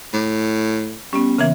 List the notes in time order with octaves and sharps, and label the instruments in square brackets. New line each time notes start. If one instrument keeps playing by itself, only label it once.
[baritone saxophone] A2
[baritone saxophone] G3 [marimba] B3 C#4
[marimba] C#3 E3 [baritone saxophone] A#3